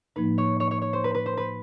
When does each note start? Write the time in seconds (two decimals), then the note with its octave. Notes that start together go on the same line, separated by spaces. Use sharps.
0.16 A2 F3 A#3 D#4 B4
0.38 C#5
0.60 C#5
0.71 C#5
0.82 C#5
0.93 C5
1.04 B4
1.14 B4
1.26 C5
1.37 B4